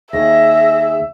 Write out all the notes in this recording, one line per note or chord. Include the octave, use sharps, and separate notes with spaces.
D#2 G#4 E5 A#6